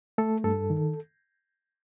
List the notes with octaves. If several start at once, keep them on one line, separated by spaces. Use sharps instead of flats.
A3 A4
G2 A4
D#3